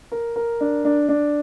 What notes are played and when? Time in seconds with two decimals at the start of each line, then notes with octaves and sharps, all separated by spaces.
0.12 A#4
0.36 A#4
0.60 D4
0.85 D4
1.09 D4